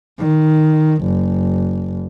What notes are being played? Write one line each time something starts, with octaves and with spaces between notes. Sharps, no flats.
D#3
F#1